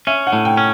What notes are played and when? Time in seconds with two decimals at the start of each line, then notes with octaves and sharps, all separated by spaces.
0.07 C#4 E5
0.27 F#5
0.33 A2
0.45 G5
0.57 C#4